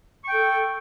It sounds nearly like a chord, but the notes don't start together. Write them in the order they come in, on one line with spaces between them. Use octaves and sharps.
C#6 G5 A4